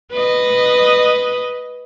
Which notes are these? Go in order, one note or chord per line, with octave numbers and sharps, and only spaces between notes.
B4 D#5